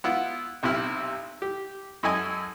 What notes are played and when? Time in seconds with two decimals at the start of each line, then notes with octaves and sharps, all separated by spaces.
0.04 B3 E4 F4
0.63 B1 C3 E4 F6
1.42 G4
2.03 F#2 E4 A4 D#5 G#5